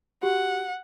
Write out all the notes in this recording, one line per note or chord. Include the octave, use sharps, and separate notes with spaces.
F#4 G4 F#5